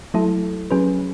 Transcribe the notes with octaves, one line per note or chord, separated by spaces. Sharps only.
F#3 A3 E4 A4
F#3 C#4 G#4 B4